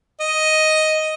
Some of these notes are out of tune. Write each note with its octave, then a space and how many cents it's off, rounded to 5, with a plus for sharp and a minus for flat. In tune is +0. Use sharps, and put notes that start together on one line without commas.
D#5 +5